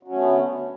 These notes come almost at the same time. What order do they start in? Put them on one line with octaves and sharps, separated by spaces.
F#3 C#4 A3 B3 D3